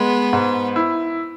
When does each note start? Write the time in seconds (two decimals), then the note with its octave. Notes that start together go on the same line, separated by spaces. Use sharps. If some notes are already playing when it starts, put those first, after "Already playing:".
Already playing: G#3 B3
0.33 G#2
0.76 E4